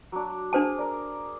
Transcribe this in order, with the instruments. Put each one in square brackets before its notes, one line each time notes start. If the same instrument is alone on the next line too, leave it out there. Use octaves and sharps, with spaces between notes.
[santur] F#3 D4
[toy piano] D4 C5 A5 [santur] G#4
[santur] A#4 D5